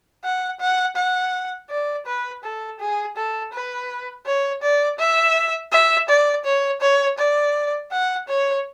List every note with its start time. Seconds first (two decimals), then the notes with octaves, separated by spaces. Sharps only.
0.24 F#5
0.60 F#5
0.96 F#5
1.70 D5
2.06 B4
2.44 A4
2.80 G#4
3.17 A4
3.53 B4
4.26 C#5
4.62 D5
4.99 E5
5.72 E5
6.09 D5
6.45 C#5
6.81 C#5
7.18 D5
7.91 F#5
8.28 C#5